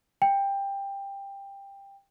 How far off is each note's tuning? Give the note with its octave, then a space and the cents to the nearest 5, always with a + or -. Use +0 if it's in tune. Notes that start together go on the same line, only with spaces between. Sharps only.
G5 +15